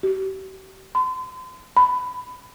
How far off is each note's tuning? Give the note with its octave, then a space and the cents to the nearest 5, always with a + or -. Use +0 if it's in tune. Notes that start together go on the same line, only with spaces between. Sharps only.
G4 -45
C6 -40
B5 +15